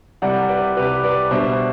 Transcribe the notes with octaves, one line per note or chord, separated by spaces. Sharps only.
C2 C3 G3 D5 F#5
B4 D5
C2 C3 G3 G4 B4
B4 D5
B2 G3 D4 C5 E5